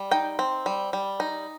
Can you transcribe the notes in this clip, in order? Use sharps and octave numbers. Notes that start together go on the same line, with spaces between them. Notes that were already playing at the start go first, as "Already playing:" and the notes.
Already playing: G3
D#4 G5
C4
G3
G3
D#4